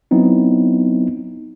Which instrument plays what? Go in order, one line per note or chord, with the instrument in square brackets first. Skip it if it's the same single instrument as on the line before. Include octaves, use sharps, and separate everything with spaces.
[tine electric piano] F#3 B3 C4 D#4 E4